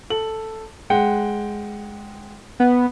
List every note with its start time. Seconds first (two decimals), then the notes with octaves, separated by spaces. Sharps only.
0.10 A4 F#7
0.90 G#3 F#5 G5
2.60 B3